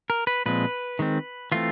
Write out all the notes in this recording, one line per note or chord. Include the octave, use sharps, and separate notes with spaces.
A#4
B4
A#2 F3 G#3 C4 B4
D#3 G#3 C4
E3 A3 C4 F4